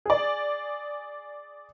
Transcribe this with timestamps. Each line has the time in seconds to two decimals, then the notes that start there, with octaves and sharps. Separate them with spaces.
0.06 G#4 D5